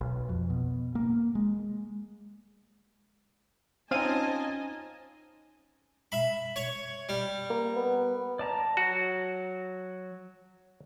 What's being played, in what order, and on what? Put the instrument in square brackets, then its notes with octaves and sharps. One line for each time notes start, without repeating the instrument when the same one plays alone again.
[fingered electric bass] B1
F2
B2
A#3
G#3
[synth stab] C4 F4 D#7 [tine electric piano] C#4 D#4 [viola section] D#5 G#5 A5
[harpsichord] E5 B5
C#5
G3
[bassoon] A#3
B3
[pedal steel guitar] D5 A5 A#5
[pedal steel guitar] F#3 [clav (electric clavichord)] F#4